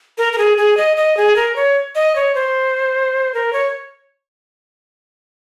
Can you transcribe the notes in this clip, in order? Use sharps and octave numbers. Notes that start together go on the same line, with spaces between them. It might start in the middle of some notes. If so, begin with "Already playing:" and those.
A#4
A#4
G#4
G#4
D#5
D#5
G#4
A#4
C#5
D#5
C#5
C5
A#4
C#5